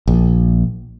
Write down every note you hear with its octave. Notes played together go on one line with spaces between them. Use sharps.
A#1